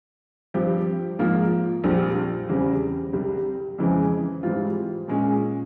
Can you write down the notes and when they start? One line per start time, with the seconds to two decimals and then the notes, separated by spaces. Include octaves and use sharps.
0.54 G2 F3 C4 G4
1.19 G#2 F3 A#3 F4
1.84 A#1 A#2 G3 C4
2.49 E2 C#3 G3 C4
3.13 C2 C3 G3
3.78 F2 C#3 E3 G#3 C4
4.43 G#2 E3 G3 C4 F4
5.08 A#2 G#3 C#4